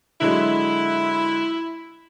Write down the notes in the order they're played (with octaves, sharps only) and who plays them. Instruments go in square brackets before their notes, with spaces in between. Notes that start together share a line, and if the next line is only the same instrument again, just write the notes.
[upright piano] D3 F#3 G#3 [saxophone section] E4